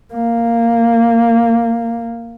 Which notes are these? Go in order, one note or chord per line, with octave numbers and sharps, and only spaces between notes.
A#3